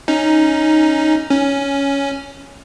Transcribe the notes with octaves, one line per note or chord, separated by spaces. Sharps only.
C#4 D#4
C#4